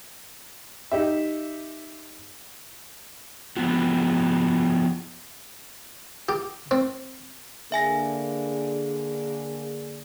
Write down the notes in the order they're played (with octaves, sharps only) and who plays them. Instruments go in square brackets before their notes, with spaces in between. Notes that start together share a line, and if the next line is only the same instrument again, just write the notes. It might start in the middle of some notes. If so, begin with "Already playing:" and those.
[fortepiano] D#4 G4 E5
[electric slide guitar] F3 B3 E4 F#4
[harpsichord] G4
C4
[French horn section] D3 A#3 G#4 [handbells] E5 G#5 A#6